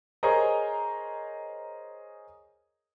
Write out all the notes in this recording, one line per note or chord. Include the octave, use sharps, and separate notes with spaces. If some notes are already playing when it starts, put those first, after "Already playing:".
G#4 A#4 C5 C#5 D#5 A#5